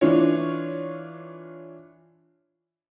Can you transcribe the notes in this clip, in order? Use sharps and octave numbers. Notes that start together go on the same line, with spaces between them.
E3 D4 F4 C#5